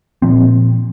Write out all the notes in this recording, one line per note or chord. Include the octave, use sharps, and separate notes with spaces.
A#2 F3 C4